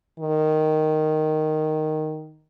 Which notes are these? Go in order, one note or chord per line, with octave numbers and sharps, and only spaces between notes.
D#3